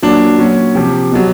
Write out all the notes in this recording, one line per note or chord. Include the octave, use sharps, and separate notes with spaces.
A#2 F#3 D4
A#2 F#3 C#4
C3 F3 G4
B2 F#3